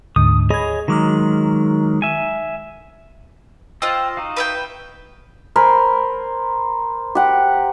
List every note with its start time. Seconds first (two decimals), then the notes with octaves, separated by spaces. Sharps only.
0.16 D2 G#2 D3 D#6
0.50 G#4 C#5 D#5 B5 G#6
0.88 D#3 F#3 G#3 A#5 D6 F6
2.02 E5 G#5
3.82 F4 C5 D#5 G5 E6
4.17 D#4 F#4 F5
4.37 B4 E5 G5
5.56 A#4 C5 G#5 B5
7.15 G4 F#5